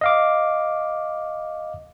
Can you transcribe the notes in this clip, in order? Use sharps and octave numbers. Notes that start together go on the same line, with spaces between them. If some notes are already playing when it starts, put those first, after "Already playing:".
D#5 F5 D6